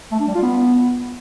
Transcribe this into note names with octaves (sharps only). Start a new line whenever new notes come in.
A3
D4
G3
F4
B3